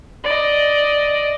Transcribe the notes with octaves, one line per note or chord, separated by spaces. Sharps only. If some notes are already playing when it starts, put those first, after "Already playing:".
D5 D#5